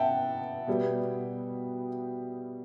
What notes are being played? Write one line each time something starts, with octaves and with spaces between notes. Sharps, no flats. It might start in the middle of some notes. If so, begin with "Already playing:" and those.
Already playing: B3 E5 F#5 G5 A5
B2 G3 B3